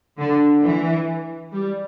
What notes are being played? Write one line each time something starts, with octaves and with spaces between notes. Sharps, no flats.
D3
E3
G3